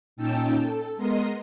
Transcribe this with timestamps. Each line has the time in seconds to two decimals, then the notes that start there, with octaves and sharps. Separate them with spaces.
0.16 A#2 C#4 D#4 G5 A5 E6
0.60 A4
0.96 G#3 B3 A#4 D#5 C6 D#6